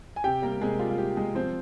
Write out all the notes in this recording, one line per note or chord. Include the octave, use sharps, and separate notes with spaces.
G#5
C3 G4 G5
G3 A#3 A#4
C3 G#3 G#4
G3 F4
F4
C3 G4
G3 G#3 G#4
F3 C4 C5